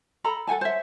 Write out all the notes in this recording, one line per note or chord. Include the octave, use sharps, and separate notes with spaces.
A4 A#5 B5
A4 F#5 G#5 A5
C5 C#5 E5